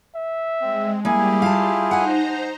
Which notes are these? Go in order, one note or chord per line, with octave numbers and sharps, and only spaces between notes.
E5
G#3 C4
G3 A#3 E4 G4 G#4 G#5
F4 F5 A5
D#4 C5 F#5 G#5 A#5